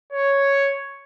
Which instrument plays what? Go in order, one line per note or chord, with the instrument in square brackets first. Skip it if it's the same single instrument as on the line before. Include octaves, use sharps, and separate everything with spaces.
[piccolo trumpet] C#5